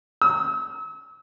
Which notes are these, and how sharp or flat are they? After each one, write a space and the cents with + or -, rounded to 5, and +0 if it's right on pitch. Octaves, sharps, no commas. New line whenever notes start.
E6 -40